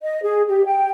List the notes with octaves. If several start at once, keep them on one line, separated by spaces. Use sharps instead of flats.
D#5
G#4
G4
G5